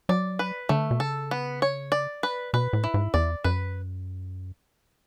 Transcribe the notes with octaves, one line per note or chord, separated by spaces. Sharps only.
F#3 D5
B4
D3 A3
B2
C#3 A4
B3
C#5
D5
B4
B2 B4
A2
E4
G#2
E2 D5
F#2 B4